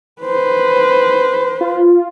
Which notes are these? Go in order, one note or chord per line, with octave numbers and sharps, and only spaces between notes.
B4 C5
F4